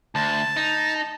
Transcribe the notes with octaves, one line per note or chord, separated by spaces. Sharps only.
D2 A5
D#4